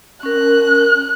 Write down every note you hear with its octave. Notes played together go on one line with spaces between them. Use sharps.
C#4 A#4 F#6